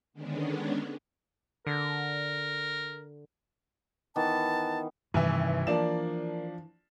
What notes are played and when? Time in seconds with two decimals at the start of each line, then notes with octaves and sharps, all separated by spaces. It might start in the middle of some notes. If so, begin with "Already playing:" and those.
0.13 D3 D#3 G#3 B3 C#4 D4
1.67 D3 A#4
4.16 D#3 E3 B3 A5
5.14 A1 G2 C3 D#3 E3 E5 G#5
5.67 E3 F3 A#3 D4 D5 E7